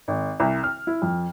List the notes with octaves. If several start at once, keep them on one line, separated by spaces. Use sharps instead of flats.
G#1
C2
F6
E4
F2